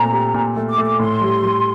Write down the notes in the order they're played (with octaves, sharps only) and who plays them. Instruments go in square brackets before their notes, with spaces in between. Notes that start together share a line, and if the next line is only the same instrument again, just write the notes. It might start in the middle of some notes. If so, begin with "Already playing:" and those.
Already playing: [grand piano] A#2 A3 C4 [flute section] A#5
[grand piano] G4
A#2
A3
[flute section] D6
[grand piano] A3
[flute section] D6
[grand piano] A2 [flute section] C6
[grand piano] G3
G3